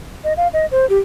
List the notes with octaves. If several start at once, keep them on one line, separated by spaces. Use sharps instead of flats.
D#5
F5
D#5
C5
G4